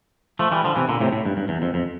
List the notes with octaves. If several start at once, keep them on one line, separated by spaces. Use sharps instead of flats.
F3 A3
E3 G3
D3 F3
C3 E3
A#2 D3
A2 C3
A2
G2
G2
E2
F2
F2